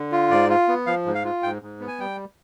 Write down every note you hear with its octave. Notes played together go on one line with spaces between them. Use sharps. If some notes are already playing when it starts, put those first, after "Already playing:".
Already playing: D3
F4
G#2 D5
F4
B3
F3 F5
G#2
F5
F4
G#2 G5
G#2
B3
G#5
G3 G5